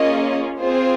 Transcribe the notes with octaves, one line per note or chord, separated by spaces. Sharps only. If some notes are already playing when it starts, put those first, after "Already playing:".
Already playing: A#3 C#4 F4 G#4 D#5
C4 F4 G#4 C5